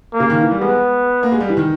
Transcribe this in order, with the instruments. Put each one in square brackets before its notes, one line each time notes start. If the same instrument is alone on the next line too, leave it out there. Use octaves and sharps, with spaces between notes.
[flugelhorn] A#3
[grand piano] C#3
D#3
E3
G3
[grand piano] G#3 [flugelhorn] B3
[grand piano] A#3
G#3
G3
E3
D#3